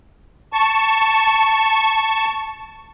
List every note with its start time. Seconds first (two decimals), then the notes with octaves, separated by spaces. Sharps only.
0.53 A5 C#6